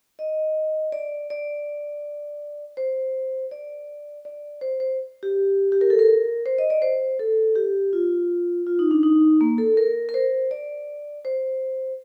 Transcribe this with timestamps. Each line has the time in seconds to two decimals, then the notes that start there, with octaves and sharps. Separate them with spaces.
0.19 D#5
0.92 D5
1.30 D5
2.77 C5
3.51 D5
4.25 D5
4.61 C5
4.80 C5
5.23 G4
5.72 G4
5.81 A#4
5.90 A4
5.99 A#4
6.46 C5
6.58 D#5
6.70 D5
6.82 C5
7.19 A4
7.56 G4
7.93 F4
8.67 F4
8.79 D#4
8.91 D4
9.03 D#4
9.41 A#3
9.58 A4
9.77 A#4
10.09 A#4
10.14 C5
10.51 D5
11.25 C5